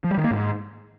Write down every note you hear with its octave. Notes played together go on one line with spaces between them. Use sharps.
F3
G3
D#3
A#3
G#2